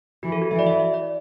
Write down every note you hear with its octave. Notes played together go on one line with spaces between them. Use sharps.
E3 F#4
A4
F#4
E3 E5
D5
E5
E5
D5